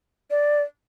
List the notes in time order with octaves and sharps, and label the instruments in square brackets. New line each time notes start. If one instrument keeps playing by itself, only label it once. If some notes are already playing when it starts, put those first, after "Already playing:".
[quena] D5